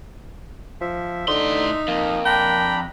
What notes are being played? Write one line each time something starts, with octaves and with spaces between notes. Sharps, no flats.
F3 E5
A2 D3 D#4 C6
F2 A#3
D4 G5 A#5 B5